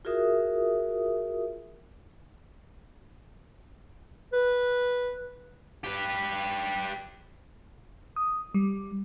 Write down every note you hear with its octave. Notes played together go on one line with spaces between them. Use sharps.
F4 F#4 G#4 A#4 E5 D#6
B4
G4 B4
D#6
G3